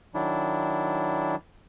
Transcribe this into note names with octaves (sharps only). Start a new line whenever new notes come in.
D#3 F#3 D4 E4